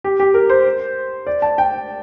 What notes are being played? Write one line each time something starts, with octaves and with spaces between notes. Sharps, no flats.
G4
G4
A#4
C5
D5
A5
G5